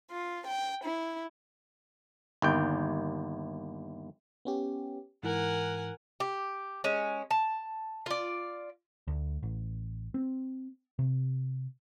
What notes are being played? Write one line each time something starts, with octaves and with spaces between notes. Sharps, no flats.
F4
G5
E4
G1 D#2 G5
B3 C#4 G4
G#2 E3 A#4 F#5 G#5 F#6
G4
G#3 C#4
A5
F4 D5
D2
A1
C4
C3